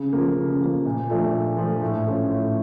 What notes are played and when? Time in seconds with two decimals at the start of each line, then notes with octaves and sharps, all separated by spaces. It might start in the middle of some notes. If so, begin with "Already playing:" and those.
Already playing: C#3
0.13 F3 A#3
0.37 C#3
0.61 F3 A#3
0.86 A#2
1.10 F3 A3 D4 F4
1.34 A#2
1.58 F3 A3 D4 F4
1.82 A2
2.06 F3 C#4 F4
2.30 A2